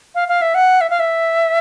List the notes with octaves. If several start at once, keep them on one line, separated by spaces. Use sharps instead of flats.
F5
F5
E5
F#5
E5
F5
E5